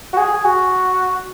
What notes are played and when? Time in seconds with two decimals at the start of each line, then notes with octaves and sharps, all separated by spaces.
0.13 F#4
0.18 G#4
0.33 G#4
0.45 F#4